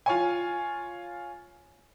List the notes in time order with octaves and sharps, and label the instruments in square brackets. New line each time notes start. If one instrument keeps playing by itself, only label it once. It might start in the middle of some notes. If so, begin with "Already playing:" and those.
[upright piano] F4 C#5 G#5